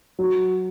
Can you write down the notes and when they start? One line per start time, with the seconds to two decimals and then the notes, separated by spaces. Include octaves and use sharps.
0.19 F#3